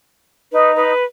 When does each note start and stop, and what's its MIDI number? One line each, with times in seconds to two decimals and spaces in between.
0.52 0.93 63
0.52 0.74 71
0.76 1.04 71